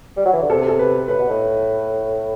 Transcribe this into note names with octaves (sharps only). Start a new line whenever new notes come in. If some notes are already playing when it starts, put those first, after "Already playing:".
G3
F#3
E3
D3
C3 A4
A4
B4
A2 B4
B2
A2